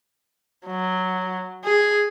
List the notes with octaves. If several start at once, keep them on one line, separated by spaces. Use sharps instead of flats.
F#3
G#4